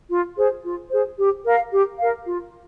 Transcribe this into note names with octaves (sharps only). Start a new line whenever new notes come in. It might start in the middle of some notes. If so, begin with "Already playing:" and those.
F4
G#4 C5
F4
G#4 C5
G4
A#4 F5
G4
A#4 F5
F4